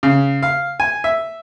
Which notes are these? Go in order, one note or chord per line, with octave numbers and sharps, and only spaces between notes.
C#3
F5
G#5
E5